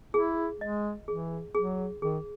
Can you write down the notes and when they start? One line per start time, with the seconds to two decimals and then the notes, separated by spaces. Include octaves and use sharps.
0.14 E4 G#4
0.60 G#3 D#5
1.08 E3 G#4
1.55 F#3 G#4
2.01 D#3 G#4